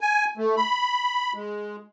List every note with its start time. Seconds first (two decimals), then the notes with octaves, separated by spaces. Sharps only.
0.01 G#5
0.37 A3
0.57 B5
1.35 G#3